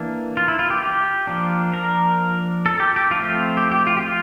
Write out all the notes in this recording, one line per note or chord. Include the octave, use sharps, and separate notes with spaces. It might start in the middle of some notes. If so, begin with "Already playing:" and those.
Already playing: E3 A#3 D4
F4
E4
F4
G4
G4
F3 A#3 D4
A#4
A4
G4
G4
F3 A3 C4 F4
G4
G4
F4
G4
F4